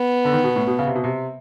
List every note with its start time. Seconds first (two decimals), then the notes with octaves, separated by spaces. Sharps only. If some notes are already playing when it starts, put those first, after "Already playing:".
Already playing: B3
0.25 D3
0.33 D#3
0.44 B2
0.56 A2
0.67 B2
0.79 C#3
0.87 C3
0.95 B2
1.04 C3